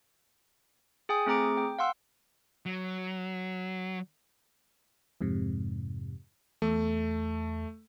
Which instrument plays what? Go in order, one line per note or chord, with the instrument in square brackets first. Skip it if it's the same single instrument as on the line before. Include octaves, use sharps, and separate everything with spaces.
[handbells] G#4 G5 G#5 D#6
A3 C4 G#4 A#5 D6 D7
G5
F5 F#5 C6 E6
[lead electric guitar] F#3
[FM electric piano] F2 G#2 C3
[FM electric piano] E2 [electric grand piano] A3